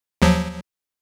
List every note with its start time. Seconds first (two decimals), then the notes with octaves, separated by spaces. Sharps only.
0.22 D#2 F3 F#3